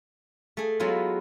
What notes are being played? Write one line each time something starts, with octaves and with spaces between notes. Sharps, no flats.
A3 G#4
F#3 G#3 B3 E4 F4